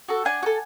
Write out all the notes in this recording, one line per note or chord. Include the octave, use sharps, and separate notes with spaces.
F#4 A4
D4 F#5 G#5
F#4
A4